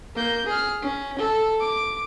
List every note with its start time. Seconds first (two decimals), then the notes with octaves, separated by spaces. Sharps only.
0.15 A#3 G6
0.47 G#4 F6
0.82 C#4
1.19 A4
1.61 D6